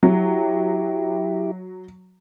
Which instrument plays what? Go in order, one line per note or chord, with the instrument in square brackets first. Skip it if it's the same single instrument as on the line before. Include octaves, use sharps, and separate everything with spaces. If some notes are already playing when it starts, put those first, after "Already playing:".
[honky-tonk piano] F#3 [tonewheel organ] E4 G4